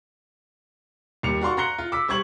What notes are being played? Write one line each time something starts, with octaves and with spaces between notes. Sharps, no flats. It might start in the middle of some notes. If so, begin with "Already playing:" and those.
D#2 G3 C#7 F7
F#4 D5 F5 C6 C#6
A#5 C6 F#6 A#6 C#7 G7
F4
D6 E6 B6
G3 C5 C#6 G#6 F#7